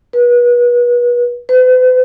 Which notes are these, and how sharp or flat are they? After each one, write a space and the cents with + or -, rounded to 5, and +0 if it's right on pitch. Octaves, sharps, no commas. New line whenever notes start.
B4 -35
B4 +45